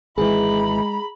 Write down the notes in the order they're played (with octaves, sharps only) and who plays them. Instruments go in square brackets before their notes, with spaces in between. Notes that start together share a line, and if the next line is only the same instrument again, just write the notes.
[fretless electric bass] G#1 E3 [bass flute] G#3 [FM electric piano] G#4 [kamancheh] A#5 B5